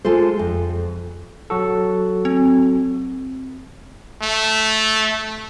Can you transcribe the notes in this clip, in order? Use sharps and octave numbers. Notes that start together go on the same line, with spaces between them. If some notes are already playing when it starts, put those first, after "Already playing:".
G#3 F4 A4 C5
F2
F#3 F#4 A4
C4
A3